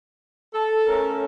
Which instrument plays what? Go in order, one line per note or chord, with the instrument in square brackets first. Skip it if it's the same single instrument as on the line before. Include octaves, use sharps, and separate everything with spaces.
[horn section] A4
[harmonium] A3 C#4 A#4